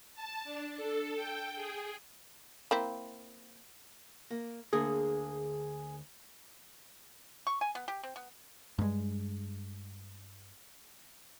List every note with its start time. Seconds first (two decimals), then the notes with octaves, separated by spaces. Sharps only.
0.15 A5
0.44 D4
0.77 A4
1.15 G5
1.55 G#4
2.71 A#3 C4 E4
4.31 A#3
4.73 D2 D3 A#3 G#4
7.47 C#6
7.61 G#5
7.75 B3
7.88 G4
8.03 C4
8.16 B3
8.79 G2 G#3